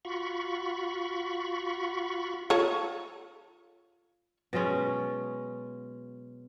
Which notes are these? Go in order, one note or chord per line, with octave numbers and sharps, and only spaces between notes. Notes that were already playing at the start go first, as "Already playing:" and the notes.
F4 F#4 B5 C#6
F4 A4 C#5
B2 F#3 G#3 C#4